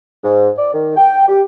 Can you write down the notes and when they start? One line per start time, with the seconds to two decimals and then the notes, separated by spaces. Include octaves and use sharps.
0.23 G#2
0.57 D5
0.74 D#3
0.97 G5
1.28 G4